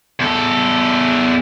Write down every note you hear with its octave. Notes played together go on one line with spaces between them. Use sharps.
E2 A4